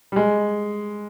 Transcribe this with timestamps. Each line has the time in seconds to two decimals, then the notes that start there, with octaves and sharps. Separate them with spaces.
0.12 G3
0.16 G#3